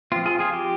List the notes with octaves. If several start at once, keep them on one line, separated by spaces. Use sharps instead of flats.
F3 C4 F4
F4 G#4
F4 G#4
G4